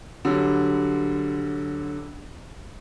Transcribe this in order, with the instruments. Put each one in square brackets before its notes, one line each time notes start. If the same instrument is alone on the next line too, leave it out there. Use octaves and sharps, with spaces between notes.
[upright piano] D3 F#3 G3